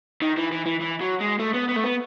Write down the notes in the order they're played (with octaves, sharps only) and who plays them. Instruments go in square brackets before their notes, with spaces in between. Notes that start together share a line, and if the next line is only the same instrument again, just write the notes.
[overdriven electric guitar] D#3
E3
E3
E3
E3
F#3
G#3
A3
B3
B3
A3
B3